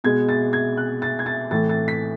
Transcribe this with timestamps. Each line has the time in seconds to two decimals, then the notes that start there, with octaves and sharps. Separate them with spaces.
0.04 B2 G#3 G#6
0.29 A6
0.53 G#6
0.77 F#6
1.02 A6
1.19 G#6
1.26 A6
1.51 A2 E3 A3 A6
1.69 A6
1.88 B6